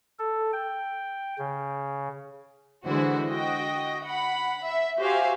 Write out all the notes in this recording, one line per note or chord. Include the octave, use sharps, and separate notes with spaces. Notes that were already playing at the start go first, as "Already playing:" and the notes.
A4
G5
C#3
D3 E3 G#3 E4 F#4 C5
F#4 D#5 G5
F#5 B5
E5
F#4 G4 C5 E5 F5 G#5